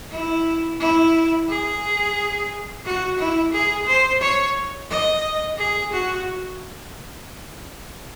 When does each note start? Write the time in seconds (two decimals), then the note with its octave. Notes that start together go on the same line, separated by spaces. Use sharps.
0.11 E4
0.80 E4
1.49 G#4
2.85 F#4
3.19 E4
3.53 G#4
3.87 C5
4.21 C#5
4.90 D#5
5.58 G#4
5.93 F#4